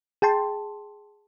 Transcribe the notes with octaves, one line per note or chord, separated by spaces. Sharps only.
G#4 G5 A5 C6